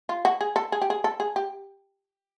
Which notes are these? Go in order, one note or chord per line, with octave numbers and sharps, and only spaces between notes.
F4
F#4
G#4
A4
G#4
G4
G#4
A4
G#4
G4